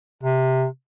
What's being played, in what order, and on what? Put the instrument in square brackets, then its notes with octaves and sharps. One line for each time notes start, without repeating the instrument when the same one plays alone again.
[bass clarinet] C3